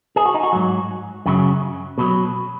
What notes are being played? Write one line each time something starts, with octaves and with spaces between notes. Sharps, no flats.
G#4
F#4
D#4
F#4
G#2 F#3
F#2 C#3 F#3
B2 F#3